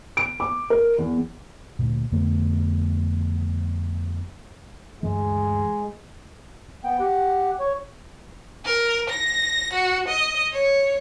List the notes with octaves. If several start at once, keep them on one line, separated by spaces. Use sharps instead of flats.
D7
D6
A#4
E2
D2 A#2
F2 D3 A3 B3
D2 G2 E3 G#3
B3 G5
G4 F#5
C#5
A#4
A#6
F#4
D#5
C#5